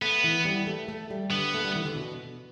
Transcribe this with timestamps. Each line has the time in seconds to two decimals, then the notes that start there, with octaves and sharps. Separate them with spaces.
0.02 A3 B3
0.24 E3
0.45 G3
0.67 A3
0.88 A3
1.10 G3
1.31 D3 B3
1.54 A3
1.65 G3
1.76 E3
1.85 D3
1.96 B2